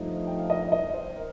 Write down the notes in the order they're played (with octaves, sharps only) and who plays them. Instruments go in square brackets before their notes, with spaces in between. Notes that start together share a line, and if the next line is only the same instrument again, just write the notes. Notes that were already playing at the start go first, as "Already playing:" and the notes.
Already playing: [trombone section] G2 F3 A3 D#4
[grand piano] G5
F5
D#5
D#5
C5
A#4